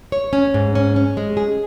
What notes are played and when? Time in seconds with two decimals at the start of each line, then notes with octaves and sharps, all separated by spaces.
0.12 C#5
0.33 C#4
0.54 G#2
0.75 C#4
0.96 C#4
1.17 G#3
1.37 G#4